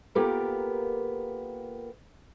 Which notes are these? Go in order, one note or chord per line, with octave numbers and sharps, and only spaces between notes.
A#3 B3 F4 G4 A4 A#4